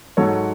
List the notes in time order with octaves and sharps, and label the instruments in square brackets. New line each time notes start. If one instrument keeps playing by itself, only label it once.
[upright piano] G#2 F#3 A4 C#5